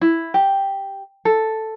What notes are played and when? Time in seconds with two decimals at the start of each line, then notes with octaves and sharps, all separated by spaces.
0.01 E4
0.34 G4
1.25 A4